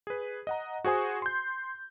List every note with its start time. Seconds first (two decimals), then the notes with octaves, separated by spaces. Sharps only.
0.07 G#4 B4
0.47 D#5 F#5 A#5
0.85 F#4 G#4 C5 G#5 D#6
1.22 C6 G6